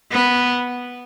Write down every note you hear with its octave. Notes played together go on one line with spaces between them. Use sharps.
B3